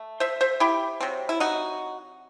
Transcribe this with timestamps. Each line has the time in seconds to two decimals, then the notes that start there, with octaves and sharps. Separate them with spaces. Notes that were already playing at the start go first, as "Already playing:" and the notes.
Already playing: A3
0.20 C5 E5
0.41 C5 E5
0.60 E4 G4
1.00 C3 F#3 C4
1.29 E4
1.40 D#4 F#4